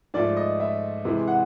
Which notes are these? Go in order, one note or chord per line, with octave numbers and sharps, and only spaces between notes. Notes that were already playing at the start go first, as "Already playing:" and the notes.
G#2 F3 A3 D5
D#5
E5
C3 E3 G#3
F#5